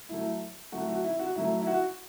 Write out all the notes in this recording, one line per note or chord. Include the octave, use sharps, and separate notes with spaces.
A2 F#3 A3 E4
A2 F#3 A3 F#4
F#4
E4
F#4
A2 F#3 A3 E4
E4
F#4